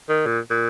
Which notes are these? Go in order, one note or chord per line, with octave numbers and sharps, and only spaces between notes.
D#3
A#2
A#2